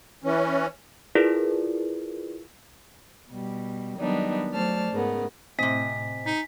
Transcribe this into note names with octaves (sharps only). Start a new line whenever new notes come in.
E3 C#4
E4 F4 G#4 A#4 B4 D5
B2 G3
D#3 F#3 G3 B3 D4 D#4
F#3 A3 C5 D5 A5 F6
G#2 C#3 B3 A#4
A2 C3 C4 D#5 G#5 B6
D#4 B6